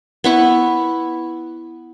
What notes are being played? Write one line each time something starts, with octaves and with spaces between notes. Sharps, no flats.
B3 E4 C#6